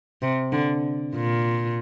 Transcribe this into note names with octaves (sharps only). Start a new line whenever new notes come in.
C3
D3
A#2